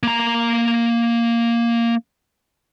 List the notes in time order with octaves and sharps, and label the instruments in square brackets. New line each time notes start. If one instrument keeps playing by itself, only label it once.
[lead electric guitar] A#3 A#5